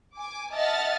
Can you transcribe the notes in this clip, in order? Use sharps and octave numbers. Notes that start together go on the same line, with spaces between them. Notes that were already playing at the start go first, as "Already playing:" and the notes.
G#5 D6
D#5 E5 F#5 A5 F6 A6